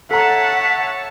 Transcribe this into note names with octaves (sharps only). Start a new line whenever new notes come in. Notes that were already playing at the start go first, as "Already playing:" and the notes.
A4 C#5 E5 F#5 A5 A#5 B6